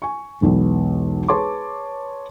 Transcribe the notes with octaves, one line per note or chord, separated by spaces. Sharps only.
G#5 C#6
E1 B1 B3
G#4 B4 C#5 A5 C6 D6